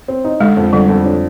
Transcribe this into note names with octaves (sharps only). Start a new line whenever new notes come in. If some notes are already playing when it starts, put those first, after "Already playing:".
C4
D#4
D3 G#3
F2
D3 G3
F2
D4